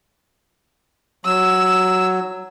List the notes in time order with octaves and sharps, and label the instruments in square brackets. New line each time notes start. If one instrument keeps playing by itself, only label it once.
[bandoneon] F#3 [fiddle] E6